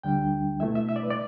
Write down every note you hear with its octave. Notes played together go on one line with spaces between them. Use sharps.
D2 D3 G3 D4 G5
B2 A3 E4 E5
E5
E5
D5
B4
D5